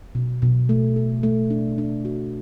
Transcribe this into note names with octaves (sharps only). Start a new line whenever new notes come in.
B2
B2
A3
A4
A3
D4
D4
F#4